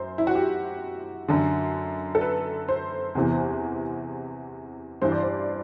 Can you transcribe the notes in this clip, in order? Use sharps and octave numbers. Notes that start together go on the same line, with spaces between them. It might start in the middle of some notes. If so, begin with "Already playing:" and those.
Already playing: F#2 C5
E4
F#4
G4
F#2 D3
A4
B4
C5
E2 C3 E3
G2 E3 C5
D5
C5